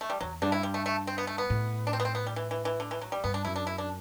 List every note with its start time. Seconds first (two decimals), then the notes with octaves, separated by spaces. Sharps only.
0.01 A3
0.10 G3
0.21 E2 F#3
0.42 G2 D4
0.52 E4
0.63 G3
0.74 A3
0.86 A3
1.07 C4
1.18 B3
1.27 A3
1.38 B3
1.50 A2
1.87 D4
1.93 C4
2.00 B3
2.05 C4
2.15 B3
2.27 G3
2.36 E3
2.51 E3
2.65 E3
2.80 D3
2.91 E3
3.02 F#3
3.12 G3
3.24 G2 B3
3.34 D4
3.45 F#2 E4
3.56 D4
3.67 E4
3.78 D4